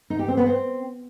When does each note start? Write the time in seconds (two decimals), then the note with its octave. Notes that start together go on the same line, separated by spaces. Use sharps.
0.10 D#4
0.19 G4
0.28 C4
0.37 B3
0.46 C4